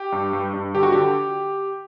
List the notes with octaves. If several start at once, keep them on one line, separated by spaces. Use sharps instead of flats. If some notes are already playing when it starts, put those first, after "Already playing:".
Already playing: G4
G2
G2
G2
D3 G4
F#4
D3 G4